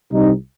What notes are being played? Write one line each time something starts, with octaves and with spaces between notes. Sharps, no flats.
C2 C3 G3 C4 D#4